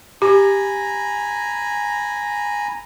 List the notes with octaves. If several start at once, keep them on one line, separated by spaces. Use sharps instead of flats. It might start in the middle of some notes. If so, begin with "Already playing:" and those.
G4 G#5 A#5 B5